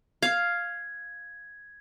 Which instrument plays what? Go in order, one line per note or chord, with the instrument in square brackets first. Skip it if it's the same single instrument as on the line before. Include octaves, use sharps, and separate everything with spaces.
[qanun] F5 [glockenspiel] G#6